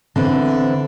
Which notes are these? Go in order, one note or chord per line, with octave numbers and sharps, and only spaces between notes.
D3 E3 C4